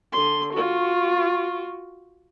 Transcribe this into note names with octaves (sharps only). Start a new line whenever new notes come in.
D3 C6
F4 F#4